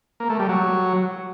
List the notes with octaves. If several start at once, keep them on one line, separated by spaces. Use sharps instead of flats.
A#3
A3
G3
F#3